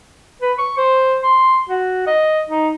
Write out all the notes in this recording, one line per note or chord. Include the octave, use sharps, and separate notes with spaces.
B4
C#6
C5
C6
F#4
D#5
D#4